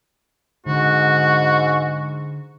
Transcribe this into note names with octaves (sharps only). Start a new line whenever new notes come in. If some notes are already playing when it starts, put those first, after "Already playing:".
G#2 D3 F#4